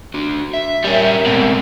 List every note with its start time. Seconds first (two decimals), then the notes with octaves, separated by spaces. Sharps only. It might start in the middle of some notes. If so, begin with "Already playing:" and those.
0.14 D4 F#4
0.54 E5
0.84 G3 C#4 A#4
1.26 G#2 B2 A3 C4